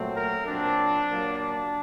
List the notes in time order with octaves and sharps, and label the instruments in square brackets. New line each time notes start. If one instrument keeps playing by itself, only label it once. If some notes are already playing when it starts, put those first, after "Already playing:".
Already playing: [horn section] A#2 F#3 A3 C4
A#4
A#2 F#3 C4 D4
A#2 F#3 A#3
D4